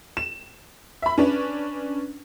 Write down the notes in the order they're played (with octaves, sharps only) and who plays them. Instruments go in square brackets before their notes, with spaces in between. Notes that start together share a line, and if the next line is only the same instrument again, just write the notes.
[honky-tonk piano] E7
E5 B5
C#4 D4 B4